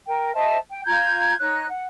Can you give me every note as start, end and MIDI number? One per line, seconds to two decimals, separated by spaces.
0.07 0.33 70
0.07 0.33 79
0.34 0.57 72
0.34 0.57 75
0.34 0.57 76
0.34 0.57 81
0.70 0.82 79
0.86 1.35 65
0.86 1.35 82
0.86 1.35 91
0.86 1.35 92
1.40 1.66 63
1.40 1.66 73
1.40 1.66 90
1.68 1.87 78